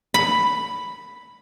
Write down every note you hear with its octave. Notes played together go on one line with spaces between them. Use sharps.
B5